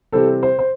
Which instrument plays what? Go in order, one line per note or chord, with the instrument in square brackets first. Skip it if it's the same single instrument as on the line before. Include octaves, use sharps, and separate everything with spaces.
[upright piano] C3 E3 G3 C4 [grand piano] A4
[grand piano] C5
C5